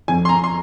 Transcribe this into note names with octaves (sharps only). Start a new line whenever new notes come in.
F2 G#5
C6
A#5
C6